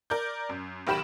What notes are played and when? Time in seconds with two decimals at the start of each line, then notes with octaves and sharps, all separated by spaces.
0.10 A#4 D5 G6
0.49 F#2
0.87 B1 D#3 G4 B5 E7